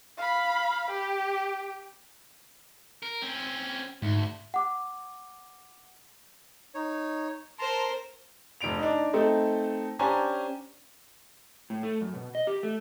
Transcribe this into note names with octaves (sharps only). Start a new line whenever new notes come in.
F5 B5
G4
A#4
C4 C#4
D2 G#2
F#5 D6
D#4 C#5
A#4 C5 A5 A#5 C6
F1 D4 D7 F7
D4 D#4
A3 C4 D#4 A4
C#4 D4 G4 C5 G#5 A#5
A2
A3
F#2
B2
D#5
G4
A3